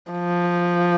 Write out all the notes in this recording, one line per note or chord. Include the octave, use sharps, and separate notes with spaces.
F3